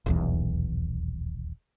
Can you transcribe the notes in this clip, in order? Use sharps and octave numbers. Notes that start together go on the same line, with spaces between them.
D#1 B1 E2